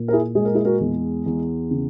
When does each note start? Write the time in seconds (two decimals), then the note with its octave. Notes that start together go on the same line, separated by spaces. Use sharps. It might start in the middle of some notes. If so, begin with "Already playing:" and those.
Already playing: A#2
0.08 A#4
0.13 E4 G#4
0.35 G#3 G#4
0.45 A#4
0.55 E4 G#4
0.65 F#4 A#4
0.80 E2
1.26 E2
1.71 C#3